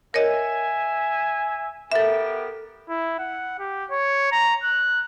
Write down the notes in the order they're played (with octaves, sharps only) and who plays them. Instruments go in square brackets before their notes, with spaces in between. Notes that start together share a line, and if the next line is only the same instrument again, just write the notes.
[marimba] A#4 C#5 D#5 [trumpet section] E5 G#5
[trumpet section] B3 G4 A#4 [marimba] A4 E5
[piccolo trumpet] E4
F#5
G4
C#5
A#5
F#6